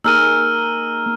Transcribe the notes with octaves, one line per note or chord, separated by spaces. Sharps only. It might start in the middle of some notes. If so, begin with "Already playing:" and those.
A#3 D#4 G#4 A#4 E6 F6 D#7